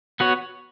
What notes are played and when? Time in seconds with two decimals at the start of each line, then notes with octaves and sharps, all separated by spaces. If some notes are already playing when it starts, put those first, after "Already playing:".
0.20 B3 F#4 C#5